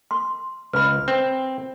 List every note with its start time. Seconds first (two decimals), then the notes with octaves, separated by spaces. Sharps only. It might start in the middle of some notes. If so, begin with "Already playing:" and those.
0.11 C6
0.73 C#2 B4 B5
1.08 C4